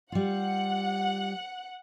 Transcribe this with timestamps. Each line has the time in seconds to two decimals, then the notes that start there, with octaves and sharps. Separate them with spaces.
0.12 G3 F4 F#5